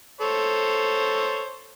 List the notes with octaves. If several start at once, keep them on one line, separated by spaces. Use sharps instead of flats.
A4 C5 C#5